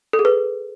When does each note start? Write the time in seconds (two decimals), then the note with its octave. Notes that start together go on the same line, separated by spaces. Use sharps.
0.13 A4
0.19 G#4
0.25 B4